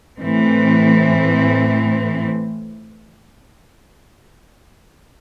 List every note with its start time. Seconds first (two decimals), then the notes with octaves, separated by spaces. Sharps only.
0.19 A2 E3 A3 C4